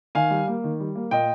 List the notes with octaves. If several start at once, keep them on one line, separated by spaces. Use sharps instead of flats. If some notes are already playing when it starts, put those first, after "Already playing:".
D#3 F5 G#5
G3
A#3
D#3
G3
A#3
A#2 D#5 G5